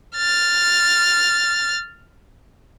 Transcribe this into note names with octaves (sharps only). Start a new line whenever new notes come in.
F6 A6